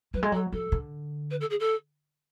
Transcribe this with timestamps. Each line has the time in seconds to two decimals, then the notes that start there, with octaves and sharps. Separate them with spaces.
0.14 F#3 B4
0.23 G#3
0.32 F#3 A4
0.52 F3 A4
0.72 D3
1.30 B4
1.40 A4
1.50 G#4
1.59 A4